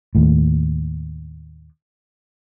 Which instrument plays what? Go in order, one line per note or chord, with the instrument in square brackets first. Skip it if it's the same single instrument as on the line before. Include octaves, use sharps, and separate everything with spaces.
[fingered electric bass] D#2 A2